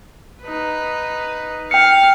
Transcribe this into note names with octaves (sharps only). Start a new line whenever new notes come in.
D#4 B4
F5 G5 C#7